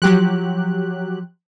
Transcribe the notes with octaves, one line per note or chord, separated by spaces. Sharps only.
F3 F#3 G4 F#6